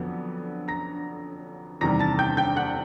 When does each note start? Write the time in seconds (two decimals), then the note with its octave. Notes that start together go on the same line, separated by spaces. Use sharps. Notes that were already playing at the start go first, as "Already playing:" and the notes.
Already playing: F2 D3 F#3 B3 D4
0.68 A#5 A#6
1.81 E2 C3 D#3 G3 A#5 A#6
1.99 A5 A6
2.19 G5 G6
2.37 G5 G6
2.56 F#5 F#6